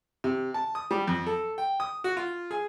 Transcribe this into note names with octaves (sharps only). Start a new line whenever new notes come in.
C3
A5
D#6
G3
F2
A4
G5
D#6
F#4
F4
G#4